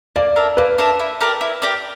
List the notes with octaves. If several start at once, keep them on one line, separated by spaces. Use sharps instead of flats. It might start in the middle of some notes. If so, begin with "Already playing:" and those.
A#3 D5
D4 A#4 E5
A#3 B4
D4 A#4 E5
E4
G4 A#4 D5
E4
G4 A#4 D5